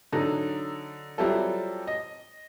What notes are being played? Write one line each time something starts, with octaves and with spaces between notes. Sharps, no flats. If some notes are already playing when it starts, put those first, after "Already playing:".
D3 F#3 D#4 A4
F#3 G3 C4 E4 F4 A4
D#5